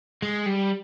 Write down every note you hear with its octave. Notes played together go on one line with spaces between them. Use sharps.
G#3
G3